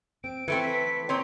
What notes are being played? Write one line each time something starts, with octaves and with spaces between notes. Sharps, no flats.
C4 D7
E3 A3 C4 B4 C#7
B6
A#2 C4 C#5 C6